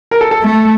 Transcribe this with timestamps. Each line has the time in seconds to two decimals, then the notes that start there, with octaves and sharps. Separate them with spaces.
0.11 A#4
0.21 A4
0.31 A4
0.42 A3